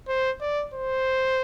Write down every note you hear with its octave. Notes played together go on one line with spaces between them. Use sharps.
C5
D5
C5